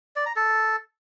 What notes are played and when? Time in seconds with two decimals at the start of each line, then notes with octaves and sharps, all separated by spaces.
0.16 D5
0.26 A#5
0.36 A4